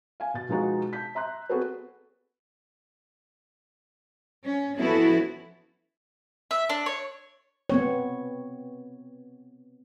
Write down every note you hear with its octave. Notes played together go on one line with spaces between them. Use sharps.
F5 G#5
B2 A6
B2 F3 G#3 B3 D#4 F#4
A5 G6 B6
E5 A#5 C6 F#6
B3 C4 F#4 G#4 A4 B4
C#4
F3 B3 C#4 E4 F#4 A4
E5
D4
C#5
B3 C4 C#5